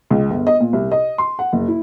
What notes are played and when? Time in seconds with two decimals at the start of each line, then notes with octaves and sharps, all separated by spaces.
0.11 C#2
0.30 G1
0.47 D#5
0.60 A#2
0.73 C2
0.91 D#5
1.18 C6
1.39 F#5
1.53 F#1
1.68 E4